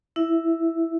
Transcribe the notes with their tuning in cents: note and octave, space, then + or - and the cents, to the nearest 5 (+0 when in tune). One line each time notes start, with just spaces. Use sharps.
E4 +0 E5 +0